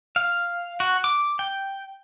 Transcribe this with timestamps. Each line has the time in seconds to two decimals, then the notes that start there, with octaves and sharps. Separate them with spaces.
0.16 F5
0.80 F#4
1.04 D6
1.39 G5